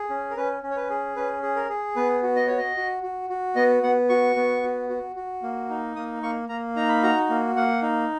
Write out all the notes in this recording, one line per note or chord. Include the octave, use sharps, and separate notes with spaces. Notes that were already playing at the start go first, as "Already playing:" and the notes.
Already playing: G#4
C#4
A#4
C#4 B4
C#4
C#5
B4
G#4
C#4 B4
G#4
A#4
G#4
B3 B4
F#4
D#5
F#4 C#5
D#5
F#4
F#4
F#4
B3 D#5
B3 F#5
F#4 C#6
B3
F#4
F#4
F#4
A#3
D#4
A#3 D#6
A#3 C#6
A#3 A#5
D#4 A#5
B5
F#4 A#5
A#3
A#3 F#5
D#4